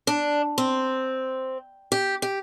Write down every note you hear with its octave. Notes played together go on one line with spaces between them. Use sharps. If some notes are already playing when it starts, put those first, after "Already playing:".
D4
C4
G4
G4